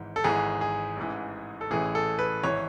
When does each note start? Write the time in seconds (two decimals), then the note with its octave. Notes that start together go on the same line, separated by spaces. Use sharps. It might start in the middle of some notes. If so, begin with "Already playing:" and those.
Already playing: G#1 G#2 E3
0.16 A4
0.24 G#1 G#2 E3 G#4
0.61 G#4
0.97 A1 G#2 E3
1.61 A4
1.71 A1 A2 E3 G#4
1.95 A4
2.19 B4
2.44 G#1 E3 C#5